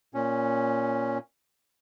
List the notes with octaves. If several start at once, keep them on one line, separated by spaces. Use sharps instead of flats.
A#2 C#4